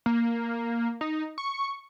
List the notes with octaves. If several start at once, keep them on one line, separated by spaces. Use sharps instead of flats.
A#3
D#4
C#6